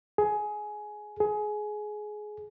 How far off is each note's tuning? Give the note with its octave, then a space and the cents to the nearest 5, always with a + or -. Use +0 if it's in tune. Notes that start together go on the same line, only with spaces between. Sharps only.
G#4 +15
G#4 +20